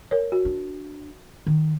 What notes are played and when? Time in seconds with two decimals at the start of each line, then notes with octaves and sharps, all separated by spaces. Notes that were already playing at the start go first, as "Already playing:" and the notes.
0.11 A#4 C#5
0.32 F#4
0.45 D4
1.46 D#3